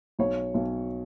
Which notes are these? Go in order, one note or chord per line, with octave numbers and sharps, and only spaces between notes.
B1 C#5
B1